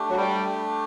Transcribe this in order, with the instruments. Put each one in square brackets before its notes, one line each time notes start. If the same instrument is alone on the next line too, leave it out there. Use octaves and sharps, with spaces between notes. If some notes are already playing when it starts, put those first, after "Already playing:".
Already playing: [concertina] A3 D4 G4
[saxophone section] F#3
G3